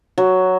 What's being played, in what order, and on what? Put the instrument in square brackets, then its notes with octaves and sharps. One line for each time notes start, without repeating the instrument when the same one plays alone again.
[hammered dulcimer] F#3